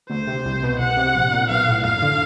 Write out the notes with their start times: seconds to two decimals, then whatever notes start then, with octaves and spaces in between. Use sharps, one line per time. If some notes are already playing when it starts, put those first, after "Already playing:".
0.10 D2 C5
0.27 C3
0.45 C2
0.63 B2
0.79 C2 F#5
0.97 C3
1.15 A#1
1.32 A#2
1.49 B1 F5
1.67 A2
1.84 F#2 F5
2.02 D3